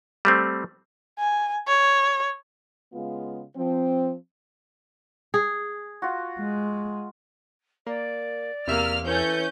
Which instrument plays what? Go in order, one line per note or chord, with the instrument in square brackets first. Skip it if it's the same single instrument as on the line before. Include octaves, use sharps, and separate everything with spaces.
[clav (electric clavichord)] G3 A3 C4
[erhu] G#5
C#5
[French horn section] C#3 G#3 B3 F4
F3 C4
[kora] G#4
[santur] F4 F#4
[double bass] G#3
[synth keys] A#3 [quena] D5
[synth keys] E2 C3 E5 [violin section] A#3 F6
[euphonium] E3 [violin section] C#4 G6 [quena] A4